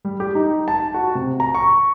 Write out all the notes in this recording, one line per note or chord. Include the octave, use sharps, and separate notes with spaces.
G3
G4
D#4
A5
F#4
C3
A#5
C#6